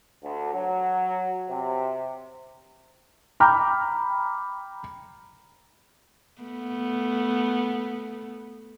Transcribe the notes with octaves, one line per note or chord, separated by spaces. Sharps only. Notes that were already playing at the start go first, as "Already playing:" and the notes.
D2
F#3
C3
G5 A#5 B5 D6 F6 G6
A3 B3